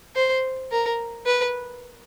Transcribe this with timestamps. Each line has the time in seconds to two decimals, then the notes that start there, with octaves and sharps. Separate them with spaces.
0.16 C5
0.72 A#4
1.26 B4